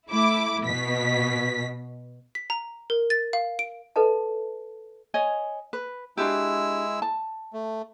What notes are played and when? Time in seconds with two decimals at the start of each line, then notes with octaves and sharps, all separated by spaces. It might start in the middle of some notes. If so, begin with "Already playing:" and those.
0.10 A3 E4 D6
0.64 B2 B6
2.35 B6
2.50 A#5
2.90 A#4
3.10 A6
3.33 F5
3.59 D7
3.96 A4 B4 D#5 A5
5.14 C#5 D#5 G#5
5.73 B4
6.17 G#3 D4 E4 F#4 G4 E6
7.02 A5
7.53 A3